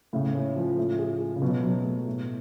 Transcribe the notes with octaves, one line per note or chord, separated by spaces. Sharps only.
A2 C#3
C#4
F3
A2
G#4
G#3
C#3
B2 F#3
F#3
A3
A2